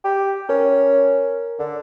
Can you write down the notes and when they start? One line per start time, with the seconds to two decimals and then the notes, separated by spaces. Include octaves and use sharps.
0.04 G4
0.49 C#4 A#4
1.59 D3